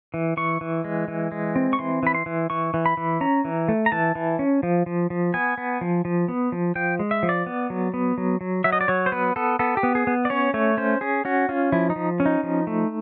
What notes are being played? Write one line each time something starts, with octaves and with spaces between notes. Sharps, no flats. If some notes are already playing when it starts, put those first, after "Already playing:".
E3
E3 C#6
E3
G#3
E3
G#3
C4
C#6
E3 C6
E3 B5
C6
E3
E3 C#6
E3
B5
E3
C#4 A#5
E3
A3
A#5
E3 A5
E3
C#4
F3
F3
F3
B3 G#5
B3
F3
F3
B3
F3
F3 G5
G#3
E5
F3
D5
B3
F#3
B3
F#3
F#3
F#3 E5
D#5
D5
F#3 C#5
C5
B3 B4
B3 A4
B3 A4
G4
B3
G#4
B3
D5
C#4 C#5
A3 C#5
C#4 C5
C#4 G#4
C#4 F#4
C#4 F4
F3 E4
D#4
F3
C#4
D#4
F3
A3